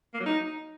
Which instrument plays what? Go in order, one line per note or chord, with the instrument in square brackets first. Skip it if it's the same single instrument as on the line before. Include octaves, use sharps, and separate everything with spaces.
[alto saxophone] A#3
F#3
D#4